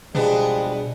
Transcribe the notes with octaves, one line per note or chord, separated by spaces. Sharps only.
B2 F3 G3 G#3 B3 D4 G#4